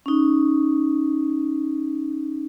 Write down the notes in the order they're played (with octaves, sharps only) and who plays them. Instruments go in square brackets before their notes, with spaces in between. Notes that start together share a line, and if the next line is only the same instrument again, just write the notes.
[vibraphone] C#4 D#4